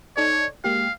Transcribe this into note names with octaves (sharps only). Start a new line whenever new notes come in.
D#4 A4 C#5 D5
G#3 A#3 G4 F5